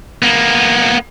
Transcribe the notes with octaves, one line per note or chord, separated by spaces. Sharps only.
A#3 B3